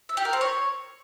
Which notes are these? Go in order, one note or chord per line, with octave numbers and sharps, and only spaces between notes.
E5
G4
A#4
C4
C#5